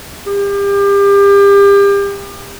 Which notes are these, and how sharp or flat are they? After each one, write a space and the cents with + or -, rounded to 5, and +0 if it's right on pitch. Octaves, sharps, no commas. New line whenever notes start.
G4 +35